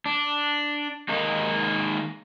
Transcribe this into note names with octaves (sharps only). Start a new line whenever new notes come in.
D4
D#3 G#3 A#3 D#4